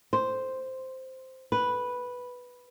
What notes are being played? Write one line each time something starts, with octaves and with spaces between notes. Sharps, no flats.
C5
B4